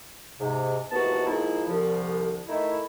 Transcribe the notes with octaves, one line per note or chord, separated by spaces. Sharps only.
G#2 C3
D#2 G#2 E3 B3 F#4 A5
F3 G#3 A#3 D#4 E4
C2 D3 F3
D#3 A3 D#4 E4